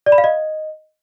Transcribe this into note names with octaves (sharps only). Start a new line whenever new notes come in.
D5
B5
F5
D#5